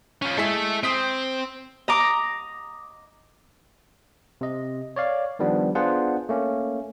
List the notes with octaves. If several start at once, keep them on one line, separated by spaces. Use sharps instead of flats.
C#4 F4
G#3 E4 A4 E5 B6
C4 D#6 B6 D7
D#5 A#5 D6
C3 D#5
C#5 D5 F5
D#3 F3 G3 B3 D4
B3 D4 F4 G#4 C5 F#5
A3 A#3 C#4